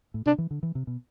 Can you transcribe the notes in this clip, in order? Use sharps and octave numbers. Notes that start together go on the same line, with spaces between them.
A2
C3 D4
E3
D3
E3
C3
B2